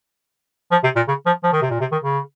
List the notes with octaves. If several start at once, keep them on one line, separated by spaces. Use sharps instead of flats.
F3
C3
A#2
C#3
F3
F3
D#3
C3
A#2
C3
D#3
C#3